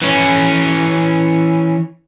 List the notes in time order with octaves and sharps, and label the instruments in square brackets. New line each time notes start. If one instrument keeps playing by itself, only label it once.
[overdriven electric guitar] E3 C#4